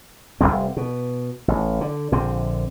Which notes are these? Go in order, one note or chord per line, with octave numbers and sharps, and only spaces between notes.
F1 E2 G3 C4
B2
A1
D3
A#1 D3 C4